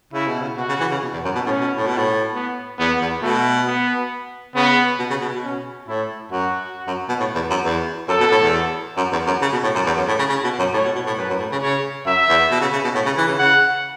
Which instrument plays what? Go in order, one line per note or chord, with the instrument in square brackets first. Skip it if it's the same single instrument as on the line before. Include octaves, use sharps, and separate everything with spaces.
[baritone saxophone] C#3 [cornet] E4
[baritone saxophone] B2
C#3
[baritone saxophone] B2 [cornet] F#4
[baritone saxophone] C#3
E3
C#3
B2
E2
F#2
B2
[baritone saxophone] A2 [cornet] C#4
[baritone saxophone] B2
A2
B2
A2
[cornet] B3
[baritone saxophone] E2 [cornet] B3
[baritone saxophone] E2
[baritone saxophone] B2 [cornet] A3
[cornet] B3
[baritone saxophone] C#3 [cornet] B3
[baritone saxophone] B2
C#3
B2
B2
[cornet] C#4
[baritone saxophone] A2 [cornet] E4
[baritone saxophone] F#2 [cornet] F#4
[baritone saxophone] F#2
B2
A2
E2
F#2
E2
[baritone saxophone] F#2 [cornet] A4
[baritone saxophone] B2
A2
E2
F#2
E2
F#2
C#3
B2
A2
F#2
E2
F#2
A2
C#3
C#3
B2
F#2
[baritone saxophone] A2 [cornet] C#5
[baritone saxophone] B2
B2
A2
[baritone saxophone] F#2 [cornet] B4
[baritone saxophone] F#2
A2
C#3
[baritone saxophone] C#3 [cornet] C#5
[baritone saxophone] F#2 [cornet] E5
[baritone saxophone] E2
B2
C#3
C#3
B2
A2
C#3
E3
C#3
[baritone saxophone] C#3 [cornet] F#5